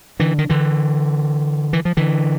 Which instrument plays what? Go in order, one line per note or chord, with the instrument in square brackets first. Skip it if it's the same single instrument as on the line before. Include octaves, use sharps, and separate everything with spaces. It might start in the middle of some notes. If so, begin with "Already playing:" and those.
[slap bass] D3 E3
D#3
D3 E3
E3
F3
D3 E3